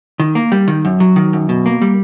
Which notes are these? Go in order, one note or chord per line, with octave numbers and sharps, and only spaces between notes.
D#3
A#3
G3
D#3
F#2
F#3
D#3
F#2
B2
A#3
G3